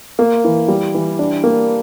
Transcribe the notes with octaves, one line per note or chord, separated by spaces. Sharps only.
A#3
E3
G3
E3
D4
A#3